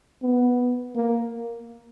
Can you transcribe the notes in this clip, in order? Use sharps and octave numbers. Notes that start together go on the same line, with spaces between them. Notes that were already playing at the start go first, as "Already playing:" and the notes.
B3
A#3